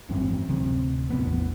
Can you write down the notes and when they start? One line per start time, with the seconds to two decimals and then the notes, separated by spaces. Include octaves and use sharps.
0.09 G#1 F#2 E3 C4
0.49 D1 C3
1.10 A1 E2 B3